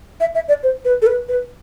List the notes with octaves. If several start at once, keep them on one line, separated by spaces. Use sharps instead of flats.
E5
E5
D5
C5
B4
A4
B4
B4